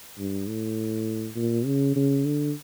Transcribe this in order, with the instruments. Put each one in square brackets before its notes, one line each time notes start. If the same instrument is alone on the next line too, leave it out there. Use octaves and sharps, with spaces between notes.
[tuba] G2
A2
A#2
C#3
C#3
D3